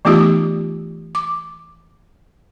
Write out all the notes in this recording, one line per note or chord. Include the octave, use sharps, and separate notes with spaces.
E3 A3 B3 D#4 F4 G4
D6